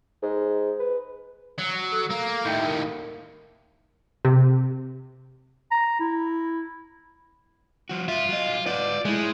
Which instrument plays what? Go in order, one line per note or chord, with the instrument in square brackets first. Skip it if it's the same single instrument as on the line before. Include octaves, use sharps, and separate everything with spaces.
[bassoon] G#2
B4
[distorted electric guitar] F#3
[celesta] A4
[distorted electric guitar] A#3
[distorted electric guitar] D#2 A2 [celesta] E5 G5 G6
[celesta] A#4
[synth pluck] C3
[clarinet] A#5
E4
[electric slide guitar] F3 F#4
[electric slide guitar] F#2 E5 [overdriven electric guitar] F4
[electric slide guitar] F#3 D#5
[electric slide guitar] F4 B4 F#5 [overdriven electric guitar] D5
[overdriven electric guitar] G#3 [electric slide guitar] A3 E4